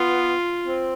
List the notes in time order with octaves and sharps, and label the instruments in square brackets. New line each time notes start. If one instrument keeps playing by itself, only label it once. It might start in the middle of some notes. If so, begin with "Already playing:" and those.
Already playing: [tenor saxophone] B3 [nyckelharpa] F4
[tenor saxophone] C4